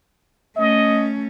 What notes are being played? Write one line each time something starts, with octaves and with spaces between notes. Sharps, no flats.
A3 C#4 D#5